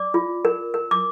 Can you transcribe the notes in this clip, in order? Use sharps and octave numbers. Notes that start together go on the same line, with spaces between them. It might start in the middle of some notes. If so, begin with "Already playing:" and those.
Already playing: D5 D6
F4
A#4
A#4
D6